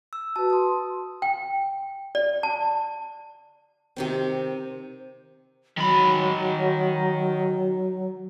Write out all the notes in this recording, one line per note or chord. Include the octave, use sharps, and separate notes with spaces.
E6
F#4 B4 A5
C6 D#6
G5
D5
A5
C3 D#3 C4
D#3 F#3 B5